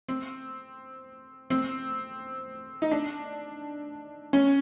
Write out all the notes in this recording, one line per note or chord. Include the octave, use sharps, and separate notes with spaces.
C4
C4
D#4
D4
C#4